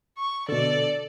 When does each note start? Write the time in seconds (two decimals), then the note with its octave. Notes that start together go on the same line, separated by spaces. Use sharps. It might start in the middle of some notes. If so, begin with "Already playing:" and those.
0.18 C#6
0.49 B2 D3 A4 D5